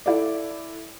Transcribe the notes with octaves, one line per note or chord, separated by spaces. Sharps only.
E4 A4 D5